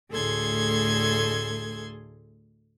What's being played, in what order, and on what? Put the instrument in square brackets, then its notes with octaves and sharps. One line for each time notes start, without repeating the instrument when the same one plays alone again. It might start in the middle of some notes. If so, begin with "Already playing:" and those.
[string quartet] D2 A2 G#4 A4 C6 G#6